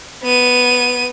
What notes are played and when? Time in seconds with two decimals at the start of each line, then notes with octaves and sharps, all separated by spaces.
0.23 B3 D#7